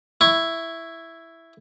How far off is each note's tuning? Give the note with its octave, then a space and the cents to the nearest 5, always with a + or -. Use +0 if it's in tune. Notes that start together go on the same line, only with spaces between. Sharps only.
E4 +5 C#6 +0